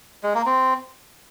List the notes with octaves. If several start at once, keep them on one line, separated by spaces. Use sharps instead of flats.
G#3
A#3
C4